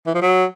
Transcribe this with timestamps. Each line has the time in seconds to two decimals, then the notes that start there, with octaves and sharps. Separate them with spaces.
0.06 E3
0.15 F3
0.22 F#3